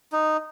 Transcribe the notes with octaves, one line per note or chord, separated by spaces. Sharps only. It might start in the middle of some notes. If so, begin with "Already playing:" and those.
D#4